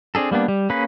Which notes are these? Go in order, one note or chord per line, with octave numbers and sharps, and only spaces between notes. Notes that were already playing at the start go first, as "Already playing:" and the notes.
C4 D4 G#4 A4
G3 A#3 B3 D4
G3
A#3 C#4 G#4 B4